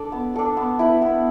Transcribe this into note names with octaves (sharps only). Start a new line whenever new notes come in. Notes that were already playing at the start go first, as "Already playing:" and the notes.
Already playing: D4 A4 D5
B3
D4 A4 D5
B3
E4 B4
B3